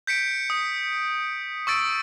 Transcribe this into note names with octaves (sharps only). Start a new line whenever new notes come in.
G6 B6 C#7 D7
D#6
C#6 E6 A6 D7